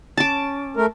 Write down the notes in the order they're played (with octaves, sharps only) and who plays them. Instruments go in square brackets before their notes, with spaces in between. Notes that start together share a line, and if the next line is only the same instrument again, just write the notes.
[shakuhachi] C#4 [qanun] A5 D6
[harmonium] A3 A#4